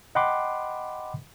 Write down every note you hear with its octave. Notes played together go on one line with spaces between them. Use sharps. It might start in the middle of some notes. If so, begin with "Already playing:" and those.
D#5 F#5 G5 B5 C6 D6